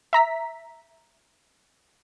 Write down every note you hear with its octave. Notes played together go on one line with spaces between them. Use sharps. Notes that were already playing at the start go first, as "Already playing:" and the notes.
E5 A#5 B6